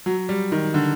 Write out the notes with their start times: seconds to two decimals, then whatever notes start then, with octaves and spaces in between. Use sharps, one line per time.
0.06 F#3
0.29 G3
0.52 D#3
0.74 D3